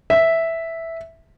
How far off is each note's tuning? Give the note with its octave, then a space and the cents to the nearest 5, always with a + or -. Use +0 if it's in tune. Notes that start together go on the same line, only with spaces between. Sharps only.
E5 -5